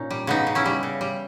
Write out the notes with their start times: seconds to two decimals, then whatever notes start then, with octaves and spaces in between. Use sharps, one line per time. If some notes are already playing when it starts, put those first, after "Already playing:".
Already playing: A#2 C#4 D#4
0.11 G3
0.27 C#3 B3 D#4
0.47 C#3
0.55 C#4 E4
0.66 G3
0.83 C#3
1.01 G3